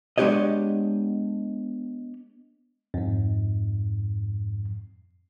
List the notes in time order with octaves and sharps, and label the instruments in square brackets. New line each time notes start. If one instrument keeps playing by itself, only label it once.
[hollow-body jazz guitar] G#3 B3 D4 G4 C#5 D#5
[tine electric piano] F2 G#2